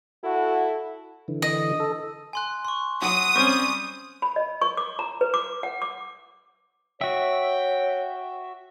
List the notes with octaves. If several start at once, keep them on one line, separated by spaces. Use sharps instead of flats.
E4 F#4 A4
D3 E3
D#5
A4
G#5 C6 F#6
C6 C#6
F#3 D#6
G3 C4 C#4 C#6 D6
B5
D#5
C#6
D6
A#5
B4
D6
F#5
D6
F#4 C#5 E5 G5